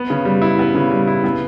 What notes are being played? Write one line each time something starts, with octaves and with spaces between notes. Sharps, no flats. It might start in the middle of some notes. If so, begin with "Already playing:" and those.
Already playing: B3
C#3
G3
E4
B3
C#3
G3
E4
B3